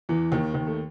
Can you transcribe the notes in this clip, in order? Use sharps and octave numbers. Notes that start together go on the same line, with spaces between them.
E2 E3
D#2 D#3
D#2 D#3
A3